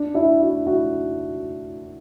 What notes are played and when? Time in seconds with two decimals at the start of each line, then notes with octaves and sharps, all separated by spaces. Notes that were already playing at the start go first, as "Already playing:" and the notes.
Already playing: D4
0.14 D4 E4
0.41 E4 F#4
0.67 E4 F#4